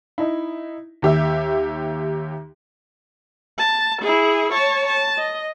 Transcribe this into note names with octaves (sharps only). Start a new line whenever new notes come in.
D#4 E4
D#2 G4 E5
A5
E4 G#4
C#5 A5
A5
D#5